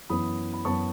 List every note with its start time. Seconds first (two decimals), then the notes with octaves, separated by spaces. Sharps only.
0.10 F#2 E3 B3 B5 D#6
0.54 B5
0.65 F#2 E3 B3 A5 C#6